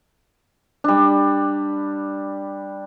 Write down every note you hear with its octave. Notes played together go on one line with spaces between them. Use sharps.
G3 D4